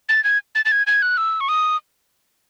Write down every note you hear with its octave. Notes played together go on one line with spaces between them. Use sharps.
A6
G#6
A6
A6
G#6
G#6
F#6
E6
C#6
D#6